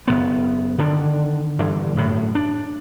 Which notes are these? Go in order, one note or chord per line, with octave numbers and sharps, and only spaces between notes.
F#1 F#2 B3
D3 D#3 D4
G2 D3 E3
F#2 A2
D4